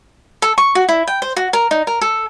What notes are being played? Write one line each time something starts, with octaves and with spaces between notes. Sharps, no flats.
A4
C#6
F#4
E4
G5
C5
F#4
A#4
D#4
A#4
A4